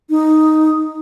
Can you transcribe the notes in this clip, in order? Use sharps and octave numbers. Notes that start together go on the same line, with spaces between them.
D#4